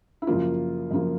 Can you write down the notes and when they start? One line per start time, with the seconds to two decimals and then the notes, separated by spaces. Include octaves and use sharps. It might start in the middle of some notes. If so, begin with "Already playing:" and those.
0.22 E4
0.27 F#2 C#3 F3 A#3 F4
0.91 F#2 C#3 F3 A#3